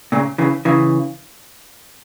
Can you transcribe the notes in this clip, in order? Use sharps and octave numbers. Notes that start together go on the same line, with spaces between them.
A#2 C#3
C#3 E3
C#3 E3